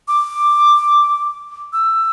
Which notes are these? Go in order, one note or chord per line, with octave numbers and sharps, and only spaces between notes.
D6
E6